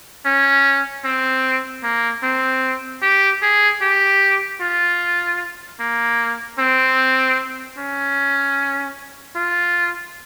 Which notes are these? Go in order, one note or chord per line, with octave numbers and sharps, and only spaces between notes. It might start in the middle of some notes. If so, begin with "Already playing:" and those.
C#4
C4
A#3
C4
G4
G#4
G4
F4
A#3
C4
C#4
F4